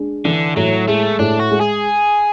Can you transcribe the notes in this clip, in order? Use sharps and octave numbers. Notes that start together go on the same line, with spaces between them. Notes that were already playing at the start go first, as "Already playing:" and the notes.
Already playing: G#3 D4
D3 E3
A2 F#3
G#3 A3
A2 D4
F#4
G#3
G#4